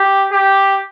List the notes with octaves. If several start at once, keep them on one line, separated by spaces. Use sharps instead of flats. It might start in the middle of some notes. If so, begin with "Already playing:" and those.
Already playing: G4
G4